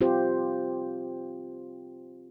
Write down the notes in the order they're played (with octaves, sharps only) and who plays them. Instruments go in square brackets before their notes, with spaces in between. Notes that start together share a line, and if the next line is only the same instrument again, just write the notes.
[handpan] C4 F4 G4 C5